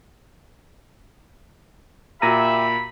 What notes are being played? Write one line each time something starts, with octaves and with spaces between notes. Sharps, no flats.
A#2 F#4 G4 E5 A#5 B5 A#6 D#7